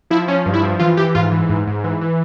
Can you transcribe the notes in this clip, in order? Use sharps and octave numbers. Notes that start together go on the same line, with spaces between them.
F3 E4
F3 C#4
G2
E4
F3
E3 F4
E3 G4
G#2 F4
E3
G#2
G#2
E3
E3